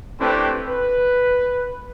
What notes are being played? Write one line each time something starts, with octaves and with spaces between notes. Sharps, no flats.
A3 C4 D4 E4 G4 B4
B4